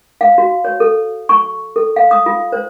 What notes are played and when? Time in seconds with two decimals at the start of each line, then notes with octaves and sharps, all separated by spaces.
0.21 F5
0.38 F#4
0.65 C#5
0.80 A4
1.29 C#6
1.76 A4
1.96 F5
2.11 D#6
2.26 F4
2.52 C5